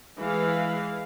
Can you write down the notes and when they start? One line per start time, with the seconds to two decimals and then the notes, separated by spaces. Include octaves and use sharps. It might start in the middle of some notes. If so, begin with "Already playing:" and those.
0.20 E3 G#3 F5